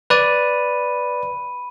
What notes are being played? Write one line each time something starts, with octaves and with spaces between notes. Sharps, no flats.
B4 D5 B5 D#7